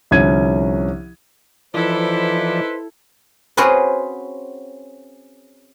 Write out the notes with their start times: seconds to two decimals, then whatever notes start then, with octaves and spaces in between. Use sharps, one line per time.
0.11 C2 D3 F3 C#4 G#6 D#7
1.74 E3 F3 D#4 E4 A4 B4 C5 D5
3.57 C4 C#4 F#4 G#4 B4 C5